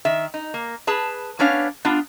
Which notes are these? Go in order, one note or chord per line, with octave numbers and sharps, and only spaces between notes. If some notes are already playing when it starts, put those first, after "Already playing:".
D#3 E5
D#4
A#3
G#4 B4 A5
B3 C#4 D4 C#5 F5
B3 D4 F4